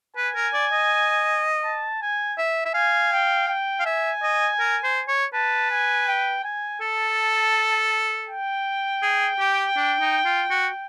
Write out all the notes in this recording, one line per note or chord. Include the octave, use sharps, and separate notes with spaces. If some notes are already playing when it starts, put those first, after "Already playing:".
B4 G#5
A#4
D5
D#5
A5
G#5
E5
E5
F5 G#5
G5
G5
F5
E5 G#5
D#5
A#4
C5
C#5
B4 A5
G#5
G5
G#5
A4 A5
G5
G#4
G4
D4
D#4
F4
F#4